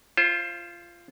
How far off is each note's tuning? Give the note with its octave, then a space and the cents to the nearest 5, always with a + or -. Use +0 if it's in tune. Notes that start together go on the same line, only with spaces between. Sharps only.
F4 -20 C5 +20